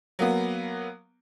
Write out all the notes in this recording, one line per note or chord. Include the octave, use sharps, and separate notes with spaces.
F#3 A#3 B3